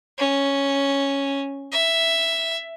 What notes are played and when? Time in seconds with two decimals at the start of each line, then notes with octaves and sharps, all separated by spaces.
0.18 C#4
1.72 E5